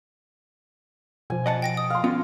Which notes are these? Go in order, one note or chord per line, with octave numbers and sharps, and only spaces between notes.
B2 F3 G#5
D#5 F#5 A5
G5 A#6 D7
D#6
F5 C6
B3 C#4 F4